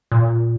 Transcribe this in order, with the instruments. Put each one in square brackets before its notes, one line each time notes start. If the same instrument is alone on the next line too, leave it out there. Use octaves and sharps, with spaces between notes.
[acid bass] A#2